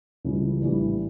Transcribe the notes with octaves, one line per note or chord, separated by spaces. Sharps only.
C#2 C#3 E3 G3
A#1 A2 E3 G3